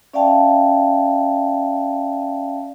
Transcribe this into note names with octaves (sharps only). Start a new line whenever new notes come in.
C#4 D5 E5 F5 G5 A5